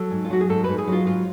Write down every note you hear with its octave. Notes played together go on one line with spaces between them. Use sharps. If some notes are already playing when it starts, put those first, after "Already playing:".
Already playing: F#3 A4
G#2
F4
F#3 F#4
G#4
G#2 A4
G#2 B4
G#4
F#3 F4
G#2 F4